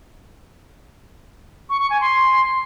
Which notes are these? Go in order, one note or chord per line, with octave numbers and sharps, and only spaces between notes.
C#6
C#6
G#5
C6